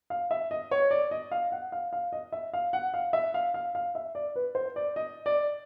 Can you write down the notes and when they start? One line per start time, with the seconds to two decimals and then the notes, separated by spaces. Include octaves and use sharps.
0.10 F5
0.31 E5
0.51 D#5
0.71 C#5
0.91 D5
1.11 D#5
1.31 F5
1.52 F#5
1.72 F5
1.93 F5
2.13 D#5
2.32 E5
2.53 F5
2.73 F#5
2.94 F5
3.13 E5
3.34 F5
3.54 F5
3.75 F5
3.95 E5
4.15 D5
4.36 B4
4.55 C5
4.76 D5
4.96 D#5
5.26 D5